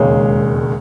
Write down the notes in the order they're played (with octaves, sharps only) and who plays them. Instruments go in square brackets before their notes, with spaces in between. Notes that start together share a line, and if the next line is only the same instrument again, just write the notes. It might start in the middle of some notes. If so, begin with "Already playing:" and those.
Already playing: [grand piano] E1 D#2 C#3 G#3 C#5